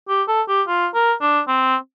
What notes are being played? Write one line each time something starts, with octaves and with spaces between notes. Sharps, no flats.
G4
A4
G4
F4
A#4
D4
C4